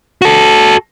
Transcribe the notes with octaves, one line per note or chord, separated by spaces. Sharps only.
F#4 A4